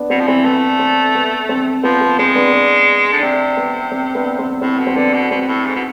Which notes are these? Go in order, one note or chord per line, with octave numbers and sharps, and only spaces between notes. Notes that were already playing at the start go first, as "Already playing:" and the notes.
Already playing: B3 D4
B2 C4
F3
E3 C4
A3 B3
C4
B3
C4
F3 B3
B3
G#3 C4
B3 D4
B3 D4
D3
D4
C3 C4
B3
C4
B3 D4
C4
A2 C4
B2
C4
D3 B3 D4
B2
B2 C4
B2
A2
G#2
B2